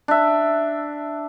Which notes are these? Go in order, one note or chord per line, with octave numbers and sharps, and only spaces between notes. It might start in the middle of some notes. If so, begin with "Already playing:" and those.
D4 E5